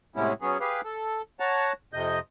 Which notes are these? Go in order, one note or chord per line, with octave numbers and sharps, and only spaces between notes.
A2 C3 G#3 B3 C#4 E4
F#3 B3 C#4 G#4
G4 G#4 B4 F5
A4
C#5 F#5 A5 A#5
F2 C3 D#5 G6